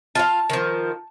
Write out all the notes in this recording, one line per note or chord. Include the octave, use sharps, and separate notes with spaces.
F4 F5 A5
D#3 F3